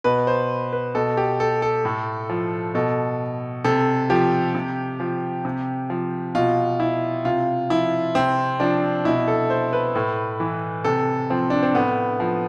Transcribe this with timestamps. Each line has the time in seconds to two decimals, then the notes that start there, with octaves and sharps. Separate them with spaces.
0.04 B2 B4
0.27 C5
0.73 B4
0.95 B2 A4
1.17 G4
1.40 A4
1.62 A4
1.85 A2
2.29 F3
2.75 B2 A4
3.64 C3 A4
4.10 F3 G4
4.55 C3
5.00 F3
5.45 C3
5.90 F3
6.35 B2 F4
6.80 E4
7.25 C3 F4
7.70 F3 E4
8.15 C3 C4
8.60 F3 D4
9.05 B2 E4
9.28 A4
9.50 C5
9.73 B4
9.95 A2
10.40 E3
10.84 C3 A4
11.30 F3 C4
11.50 D4
11.63 C4
11.75 A2 B3
12.20 F3